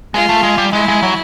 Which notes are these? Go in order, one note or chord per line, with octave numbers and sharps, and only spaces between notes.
G#3 F4
A3
G#3
G3
G#3 E4
G#3
F#3